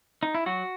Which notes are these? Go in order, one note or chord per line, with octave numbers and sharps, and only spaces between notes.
D#4
E4
F#3 F#4